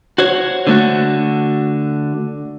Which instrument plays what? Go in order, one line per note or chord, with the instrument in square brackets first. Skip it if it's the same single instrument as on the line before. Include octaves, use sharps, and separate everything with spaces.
[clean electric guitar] F#4 C5 C#5
D3 A3 F#4